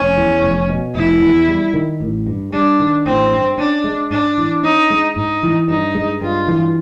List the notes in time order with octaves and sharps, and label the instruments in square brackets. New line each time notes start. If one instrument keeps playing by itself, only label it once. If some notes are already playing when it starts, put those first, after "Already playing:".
Already playing: [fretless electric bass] F1 [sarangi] C#4
[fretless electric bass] E2
F1
B2
[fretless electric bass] F1 [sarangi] E4
[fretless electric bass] E2
G3
D#3
A1
G2
[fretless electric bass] G3 [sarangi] D4
[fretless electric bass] D#3
[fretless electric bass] A1 [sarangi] C4
[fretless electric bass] G2
[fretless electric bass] C#4 [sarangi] D4
[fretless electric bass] G#3
[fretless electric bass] G#2 [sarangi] D4
[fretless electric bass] E3
[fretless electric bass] C#4 [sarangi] D#4
[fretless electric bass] G#3
[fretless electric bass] G#2 [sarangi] D#4
[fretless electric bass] E3
[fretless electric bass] G2 [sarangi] D#4
[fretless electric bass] G#3
[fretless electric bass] G2 [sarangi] F4
[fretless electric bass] E3